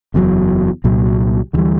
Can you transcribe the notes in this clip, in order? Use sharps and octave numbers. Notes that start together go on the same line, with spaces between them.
F#1 E2 C#3 F#3
C2 A#2 F#3
D2 C#3 E3 G3